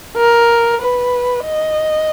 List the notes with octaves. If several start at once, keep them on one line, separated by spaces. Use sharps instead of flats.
A#4
B4
D#5